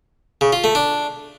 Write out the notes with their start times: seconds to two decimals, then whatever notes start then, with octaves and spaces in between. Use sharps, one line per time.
0.41 C#3
0.53 F4
0.64 A3
0.75 D4